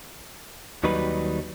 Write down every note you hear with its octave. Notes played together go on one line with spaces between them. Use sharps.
D#2 D#3 F#3 G3 D#4 B4